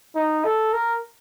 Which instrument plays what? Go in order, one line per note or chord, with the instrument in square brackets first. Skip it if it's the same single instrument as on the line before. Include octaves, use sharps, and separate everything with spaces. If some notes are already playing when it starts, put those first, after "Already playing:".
[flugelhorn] D#4
A4
A#4